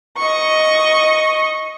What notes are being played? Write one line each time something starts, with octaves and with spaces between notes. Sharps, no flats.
D#5 C#6